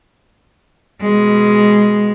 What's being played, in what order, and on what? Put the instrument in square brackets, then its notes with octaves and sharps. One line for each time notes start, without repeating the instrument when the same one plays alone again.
[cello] B2 G#3